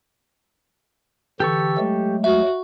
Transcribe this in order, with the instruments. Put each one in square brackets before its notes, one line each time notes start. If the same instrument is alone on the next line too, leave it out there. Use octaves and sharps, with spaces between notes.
[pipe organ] D3 E3 E6 [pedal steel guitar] G4 A4 C#6
[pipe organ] F#3 G#3 A3
[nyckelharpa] F#4 [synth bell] E5